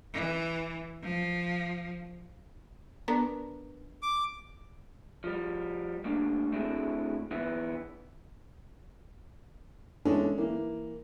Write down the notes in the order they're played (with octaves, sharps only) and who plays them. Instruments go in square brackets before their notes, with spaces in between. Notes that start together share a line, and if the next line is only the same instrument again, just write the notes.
[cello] E3
F3
[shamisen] B3 D4 A#4
[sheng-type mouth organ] D6
[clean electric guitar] F3 G3
G3 A3 A#3 D4
A3 C4 D4 E4 F#4 G#4
E3 B3 D#4 E4
[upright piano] E3 G#3 C#4 D4 A4
E3 A#3